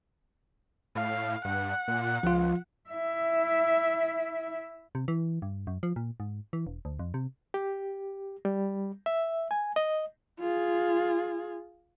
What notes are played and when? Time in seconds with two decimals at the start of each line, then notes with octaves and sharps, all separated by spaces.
0.95 A2 F5
1.45 G2 F#5
1.88 A#2
2.23 C#2 F3 F4
2.90 E4 E5
4.95 C3
5.08 E3
5.42 G2
5.67 F#2
5.83 F3
5.96 A#2
6.20 G#2
6.53 E3
6.67 E1
6.85 D2
6.99 F2
7.14 C3
7.54 G4
8.45 G3
9.06 E5
9.51 G#5
9.76 D#5
10.40 F4 G#4